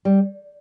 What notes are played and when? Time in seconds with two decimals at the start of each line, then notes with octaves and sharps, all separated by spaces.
0.05 G3